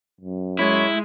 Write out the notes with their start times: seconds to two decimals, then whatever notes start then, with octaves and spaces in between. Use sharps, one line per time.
0.21 F#2
0.59 G#3 E4 C#5